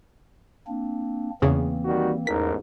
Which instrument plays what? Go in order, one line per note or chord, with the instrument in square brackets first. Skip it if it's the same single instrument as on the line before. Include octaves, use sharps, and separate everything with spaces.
[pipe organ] A#3 C4 D4
[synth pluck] E2 C#3 [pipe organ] E3 A#3 C4
[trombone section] D#3 G3 F#4
[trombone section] A1 G#2 A#4 [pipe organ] E2 D#4 [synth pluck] B6